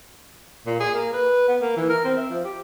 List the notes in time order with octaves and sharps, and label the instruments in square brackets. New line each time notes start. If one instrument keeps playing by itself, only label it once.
[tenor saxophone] A#2
G#4
A#3
B4
B3
A#3
E3
A#4
C4
E5
F3
G4